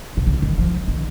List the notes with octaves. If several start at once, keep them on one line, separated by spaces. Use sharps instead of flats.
C3
C#3
D#3
F3
D#3